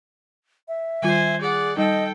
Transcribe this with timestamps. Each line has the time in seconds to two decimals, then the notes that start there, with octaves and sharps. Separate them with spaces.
0.68 E5
1.02 D#3 G3 F4 C5 G#5
1.41 G#4 D5 F#5
1.77 G3 D#4 A4 D#5 G5